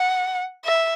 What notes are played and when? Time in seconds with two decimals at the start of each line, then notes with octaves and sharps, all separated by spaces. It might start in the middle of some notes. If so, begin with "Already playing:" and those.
Already playing: F#5
0.66 E5